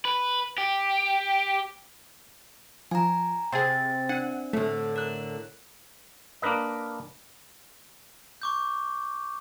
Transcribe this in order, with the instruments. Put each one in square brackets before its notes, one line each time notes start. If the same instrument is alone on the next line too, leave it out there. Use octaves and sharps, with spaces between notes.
[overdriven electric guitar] B4
G4
[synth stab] F3 [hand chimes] G#5 A#5
[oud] C3 [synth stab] G#4 C5 [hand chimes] G5 A6
[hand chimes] D4 [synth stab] F#5
[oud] A2 D3 [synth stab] A3
[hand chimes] A#4 F#6
[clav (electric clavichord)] A#3 D4 A#4 B4 D#5
[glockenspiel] C#6 D6 G6